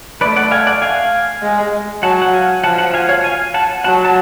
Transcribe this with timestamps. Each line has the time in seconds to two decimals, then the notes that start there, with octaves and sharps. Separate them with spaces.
0.21 A3 B4 D5
0.36 D5 F#5
0.51 F5 G#5
0.67 D5 F#5
0.82 F5 G#5
1.43 G#3
2.03 F#3 F#5 A5
2.22 F#5
2.33 F5 G#5
2.64 F3 F#5 A5
2.78 F#5 A5
2.94 F5 G#5
3.09 C#5 F5
3.24 F5 G#5
3.54 F#5 A5
3.84 F#3 F#5 A5
4.05 A5